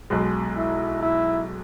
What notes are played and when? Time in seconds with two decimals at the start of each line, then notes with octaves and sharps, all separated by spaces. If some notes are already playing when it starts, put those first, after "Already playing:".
0.10 B1 B2 G#3
0.57 E4
1.03 E4